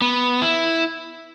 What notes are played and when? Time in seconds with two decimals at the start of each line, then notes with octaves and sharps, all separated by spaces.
0.01 B3
0.42 E4